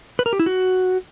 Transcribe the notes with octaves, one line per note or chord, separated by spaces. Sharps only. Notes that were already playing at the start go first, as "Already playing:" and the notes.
B4
A#4
G4
E4
F#4